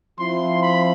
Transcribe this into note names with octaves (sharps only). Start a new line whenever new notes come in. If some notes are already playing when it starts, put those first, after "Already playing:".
F3 C4 E4 C6
B5